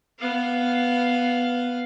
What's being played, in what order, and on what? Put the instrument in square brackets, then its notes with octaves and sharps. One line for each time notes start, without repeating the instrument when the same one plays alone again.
[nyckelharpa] B3 F5